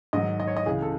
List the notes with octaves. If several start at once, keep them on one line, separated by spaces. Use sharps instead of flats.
G#2 D#3 F#3 D#5
D#5
C#5
D#5
C#2 C#3 E3 G#4
A4